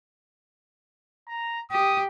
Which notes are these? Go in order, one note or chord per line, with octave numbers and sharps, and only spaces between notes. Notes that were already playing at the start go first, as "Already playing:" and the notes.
A#5
G4 D#6